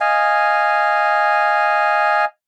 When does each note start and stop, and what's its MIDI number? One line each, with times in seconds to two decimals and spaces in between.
0.01 2.25 75
0.01 2.25 77
0.01 2.25 80